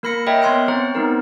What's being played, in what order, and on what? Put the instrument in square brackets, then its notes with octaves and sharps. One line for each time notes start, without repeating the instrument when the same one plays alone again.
[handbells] A#3 A#4 B5 A#6 C#7
A#4 C#5 D#5 E5 G5
B3 C#5 C6 F#6 D7
C4 C5 A#5
A3 B3 D#4 A#4